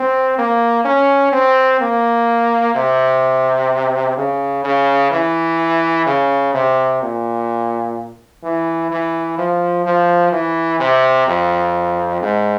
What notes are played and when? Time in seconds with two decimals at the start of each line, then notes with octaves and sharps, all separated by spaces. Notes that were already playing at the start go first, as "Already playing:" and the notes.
Already playing: C4
0.38 A#3
0.85 C#4
1.32 C4
1.81 A#3
2.75 C3
4.17 C#3
4.64 C#3
5.11 E3
6.06 C#3
6.54 C3
7.02 A#2
8.43 E3
8.91 E3
9.38 F3
9.85 F3
10.32 E3
10.80 C3
11.28 F2
12.22 G#2